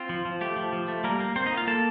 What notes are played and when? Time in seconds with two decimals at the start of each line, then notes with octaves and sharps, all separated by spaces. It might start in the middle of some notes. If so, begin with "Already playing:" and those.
Already playing: C4 F4
0.09 F3
0.25 F3
0.41 A3 G4
0.56 F3
0.73 F3
0.88 A3
1.04 G3 A#3 A#4
1.20 A#3
1.36 A#3 C4 C5
1.46 D#4 D#5
1.52 A#3
1.57 F4 F5
1.67 A#3 A4 A5